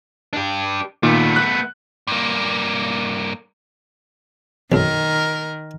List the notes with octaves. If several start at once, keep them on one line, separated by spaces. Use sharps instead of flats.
D4 G4
A#2 D#3 A3 B3
F#6
G2 A#3
B1 F#2 D#3 A#4